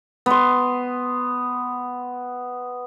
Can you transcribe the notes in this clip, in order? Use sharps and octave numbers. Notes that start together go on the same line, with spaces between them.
B3 C6